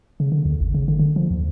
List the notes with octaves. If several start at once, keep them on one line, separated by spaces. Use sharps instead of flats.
C#3
D3
D#2
G#1
C#3
D3
D3
F3
D#2